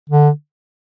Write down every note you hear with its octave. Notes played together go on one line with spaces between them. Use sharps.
D3